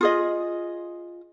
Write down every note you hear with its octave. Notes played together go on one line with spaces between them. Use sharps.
F4 G#4 D#5